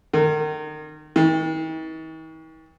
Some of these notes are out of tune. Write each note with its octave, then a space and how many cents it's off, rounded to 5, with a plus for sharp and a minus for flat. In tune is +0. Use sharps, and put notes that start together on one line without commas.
D#3 -30
D#3 +45